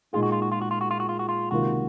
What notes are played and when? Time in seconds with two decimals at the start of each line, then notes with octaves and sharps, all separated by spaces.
0.13 A#2 G#3 D#4 F4 G#4
0.23 F#4
0.32 F4
0.42 F#4
0.52 F4
0.61 F#4
0.71 F4
0.81 F#4
0.91 F4
1.00 F#4
1.09 F4
1.19 F#4
1.29 F4
1.51 C#2 C3 D#3 A#3 F4 F#4